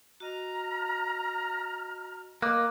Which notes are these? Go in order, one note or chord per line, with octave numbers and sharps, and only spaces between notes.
F#4 D#5 A#5 F6
A#3 A#4 D#5 D6 F#6